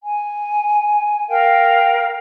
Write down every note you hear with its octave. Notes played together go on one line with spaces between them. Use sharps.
G#5
A#4 F5 G5